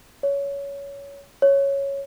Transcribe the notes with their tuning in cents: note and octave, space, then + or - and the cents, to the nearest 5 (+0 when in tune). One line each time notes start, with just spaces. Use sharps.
C#5 +15
C#5 -5